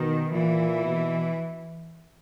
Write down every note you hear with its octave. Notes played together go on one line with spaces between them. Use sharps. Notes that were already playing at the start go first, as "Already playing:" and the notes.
Already playing: B2 D#3
A#2 E3
B2